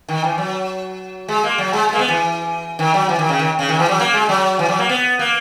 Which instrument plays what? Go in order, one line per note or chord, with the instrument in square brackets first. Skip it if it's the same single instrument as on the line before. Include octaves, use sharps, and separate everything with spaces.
[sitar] D#3
E3
F#3
G#3
A#3
F#3
G#3
G#3 A#3
B3
E3
D#3
F#3
E3
D#3
C#3
D#3
C#3
D#3
E3
F#3
A#3
G#3
F#3
E3
F#3
A#3
B3
A#3